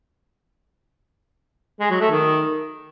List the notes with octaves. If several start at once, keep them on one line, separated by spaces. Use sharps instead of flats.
G#3
F#3
A3
D#3